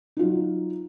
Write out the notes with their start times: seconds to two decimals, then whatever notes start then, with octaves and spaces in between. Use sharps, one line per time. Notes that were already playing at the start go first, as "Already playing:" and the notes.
0.17 D#4
0.19 F4
0.22 F#3